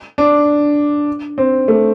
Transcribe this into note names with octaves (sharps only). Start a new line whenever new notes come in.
D4
C4
A3